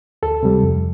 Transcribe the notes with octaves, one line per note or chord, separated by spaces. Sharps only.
D2 A4
C3 G3
F2